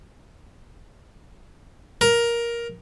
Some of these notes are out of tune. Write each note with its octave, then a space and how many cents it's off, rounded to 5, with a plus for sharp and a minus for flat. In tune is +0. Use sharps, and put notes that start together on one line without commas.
A#4 +10